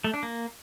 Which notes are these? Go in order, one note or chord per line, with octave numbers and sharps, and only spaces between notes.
A3
D4
A#3